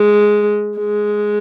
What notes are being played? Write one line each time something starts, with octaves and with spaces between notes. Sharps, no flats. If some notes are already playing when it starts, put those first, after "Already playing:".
Already playing: G#3
G#3